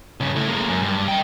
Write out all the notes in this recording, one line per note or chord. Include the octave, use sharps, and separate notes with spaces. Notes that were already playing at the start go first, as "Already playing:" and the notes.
G2 C#3
A3 E4
G#3 A#3
F#2
G2
D#5 G5